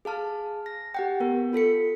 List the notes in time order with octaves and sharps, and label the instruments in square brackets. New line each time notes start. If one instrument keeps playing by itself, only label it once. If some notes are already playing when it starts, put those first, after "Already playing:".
[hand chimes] G#4 F5 A5 F6
A#6
G4 F#5 G5
B3 A#4
F4 A4 B6 C#7